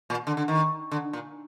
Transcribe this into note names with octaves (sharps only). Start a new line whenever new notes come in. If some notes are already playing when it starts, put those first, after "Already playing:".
A#2
D3
D3
D#3
D3
A#2